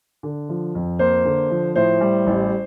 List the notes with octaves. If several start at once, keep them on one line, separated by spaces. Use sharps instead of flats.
D3
F3
F2
A#3 C5
D3
F3
A2 C5
G3
A1